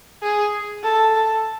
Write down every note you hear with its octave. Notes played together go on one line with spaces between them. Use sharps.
G#4
A4